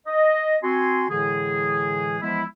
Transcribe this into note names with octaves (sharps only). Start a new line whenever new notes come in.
D#5
C4 F#4 G#5 C6
A2 D3 E3 G#3 G#4
E3 F3 G#3 B3 E4